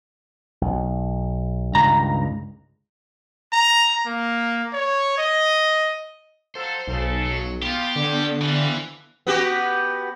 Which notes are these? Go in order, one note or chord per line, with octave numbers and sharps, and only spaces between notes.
B1
C#2 G2 D#3 A#5
A#5
A#3
C#5
D#5
F3 F#3 A4 C5
B1 C#3 A4
F#3
B3 F4 G4
G2 D3
E3 F3 G3
B3 F#4 G4